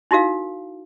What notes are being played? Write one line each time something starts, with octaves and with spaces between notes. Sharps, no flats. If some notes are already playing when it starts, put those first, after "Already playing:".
D#4 E4 F#4 A#4 F5